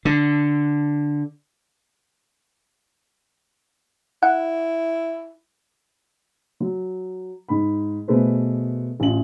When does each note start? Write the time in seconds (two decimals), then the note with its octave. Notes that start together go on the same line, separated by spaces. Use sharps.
0.05 D3
4.23 E4 F#5
6.60 F#3
7.49 G#2 B5
8.08 B2 A3 G#4 B4 C5
9.00 A1 F4 F#7